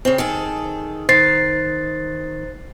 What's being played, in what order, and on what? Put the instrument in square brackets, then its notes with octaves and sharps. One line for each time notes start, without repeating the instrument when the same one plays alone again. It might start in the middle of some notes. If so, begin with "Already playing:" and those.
[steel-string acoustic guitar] C#3 C4
D#3 G#4 A4
[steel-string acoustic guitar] D#3 [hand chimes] C5 A6 C7